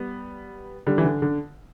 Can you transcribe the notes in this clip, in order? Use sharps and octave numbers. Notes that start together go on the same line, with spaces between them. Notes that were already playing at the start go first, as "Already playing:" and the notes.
Already playing: G3 B3
D3 G3
E3
D3
D3